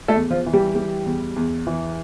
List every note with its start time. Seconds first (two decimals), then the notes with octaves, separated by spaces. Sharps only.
0.08 A3 A4
0.15 E2
0.30 F3 F4
0.46 E3
0.53 G3 G4
0.76 G3
1.06 E2
1.36 E2
1.67 E3